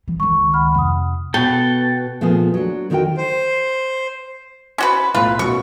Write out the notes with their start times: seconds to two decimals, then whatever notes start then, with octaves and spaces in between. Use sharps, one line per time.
0.08 E3
0.20 C#2 D#3 C#6
0.54 F#5 B5 F6
0.75 F2 C3 F#5 D#6
1.34 B2 A4 G5
2.21 A#2 F3 A3 B3 G#4
2.54 F#3 D4
2.90 D3 D#3 B3 F#4 A#4 G5
3.17 C5
4.78 C#4 F#4 B4 C5
5.14 B1 A2 F4 B4
5.39 F#2 B2 C#6